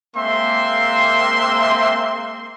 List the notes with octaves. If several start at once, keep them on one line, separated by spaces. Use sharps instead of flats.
G#3 A#3 C4 E5 C6